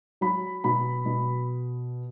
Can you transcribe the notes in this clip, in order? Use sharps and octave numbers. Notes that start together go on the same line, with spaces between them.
F#3 B5
B2 B5
B2